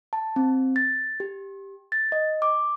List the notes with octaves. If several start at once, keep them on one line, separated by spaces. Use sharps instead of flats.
A5
C4
A6
G4
A6
D#5
D6